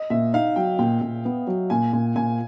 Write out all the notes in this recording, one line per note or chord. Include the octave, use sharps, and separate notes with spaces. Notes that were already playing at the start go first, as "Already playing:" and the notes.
Already playing: D#5
A#2 E5
D#4 F5
F#3 G5
A#2 G5
A#2
B3
F#3
A#2 G#5
A#2
A#2 G#5